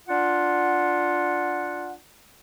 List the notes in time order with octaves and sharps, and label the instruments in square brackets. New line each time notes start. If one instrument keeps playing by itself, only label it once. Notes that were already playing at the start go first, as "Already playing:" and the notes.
[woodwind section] D4 F4 F#5